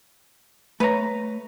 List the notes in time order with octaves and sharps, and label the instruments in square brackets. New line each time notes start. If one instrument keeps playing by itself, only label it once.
[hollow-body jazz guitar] A3 A#5 [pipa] B4 C#5